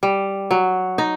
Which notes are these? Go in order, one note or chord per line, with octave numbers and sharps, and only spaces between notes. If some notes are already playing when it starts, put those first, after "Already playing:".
G3
F#3
D#4